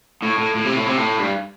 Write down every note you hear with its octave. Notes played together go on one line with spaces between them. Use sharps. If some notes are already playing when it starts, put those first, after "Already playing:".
A2
A2
A2
C3
A2
C3
A2
G2